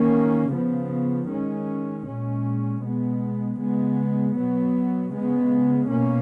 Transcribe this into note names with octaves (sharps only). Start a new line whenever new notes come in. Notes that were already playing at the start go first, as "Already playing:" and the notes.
Already playing: D#3 A#3 C#4
C#3 F3 B3
D#3 G#3 C#4
A#2 G#3 C#4
B2 G#3 B3
C#3 G#3 B3
B2 F#3 B3
C#3 G#3 B3
B2 A#3 C#4